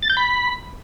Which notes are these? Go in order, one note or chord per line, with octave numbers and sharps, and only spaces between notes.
A6
G6
B5